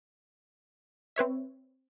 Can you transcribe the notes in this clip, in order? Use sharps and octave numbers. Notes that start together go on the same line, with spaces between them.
C4 B4 C#5 E5